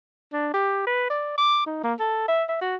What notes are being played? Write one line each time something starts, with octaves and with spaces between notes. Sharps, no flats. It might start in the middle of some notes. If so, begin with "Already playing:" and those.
D4
G4
B4
D5
D6
D#4
A#3
A4
E5
E5
F#4